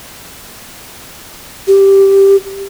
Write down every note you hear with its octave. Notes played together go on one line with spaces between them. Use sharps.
G4